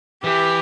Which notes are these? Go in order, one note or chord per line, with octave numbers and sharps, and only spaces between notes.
E3 G4